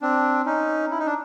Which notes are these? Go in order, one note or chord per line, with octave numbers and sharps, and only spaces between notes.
C4 D4
C#4 D#4
E4
D#4
D4